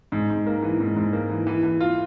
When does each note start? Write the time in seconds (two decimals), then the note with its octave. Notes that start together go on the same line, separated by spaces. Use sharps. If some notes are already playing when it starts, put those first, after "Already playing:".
0.12 G#2
0.30 G#2
0.47 A#3
0.63 E3
0.80 G#2
0.96 G#2
1.13 A#3
1.30 E3
1.47 E3
1.63 E3
1.80 F4